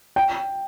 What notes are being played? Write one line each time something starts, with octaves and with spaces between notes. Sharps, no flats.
G5